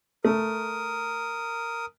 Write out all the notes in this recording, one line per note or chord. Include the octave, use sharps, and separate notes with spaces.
A3 A#4 D#6